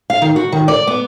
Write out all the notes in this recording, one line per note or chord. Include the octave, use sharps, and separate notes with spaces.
F5
D#3
F#4
D#3
D5
B3